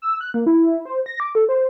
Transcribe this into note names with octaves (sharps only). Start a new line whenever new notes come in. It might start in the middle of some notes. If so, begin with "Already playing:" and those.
E6
F#6
A#3
E4
E4
C5
A#6
D6
A4
C5